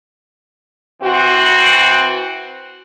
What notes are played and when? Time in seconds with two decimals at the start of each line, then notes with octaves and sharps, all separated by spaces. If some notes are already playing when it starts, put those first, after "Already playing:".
1.03 E3 C4 F#4